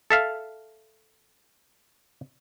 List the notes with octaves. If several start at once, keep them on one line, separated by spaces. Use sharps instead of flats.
A4 E5 F5